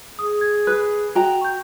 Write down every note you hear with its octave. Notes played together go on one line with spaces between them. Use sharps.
G#4 D#6
G#6
B4 F#6
F#4 G5 A#5
C#6 G6